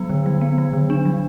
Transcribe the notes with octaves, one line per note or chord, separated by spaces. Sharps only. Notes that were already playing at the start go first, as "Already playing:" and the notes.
Already playing: F#3 B3
D3
F#3
B3
F#3
D3
D4
F#3